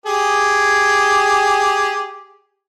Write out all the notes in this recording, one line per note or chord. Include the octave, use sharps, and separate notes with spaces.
G4 G#4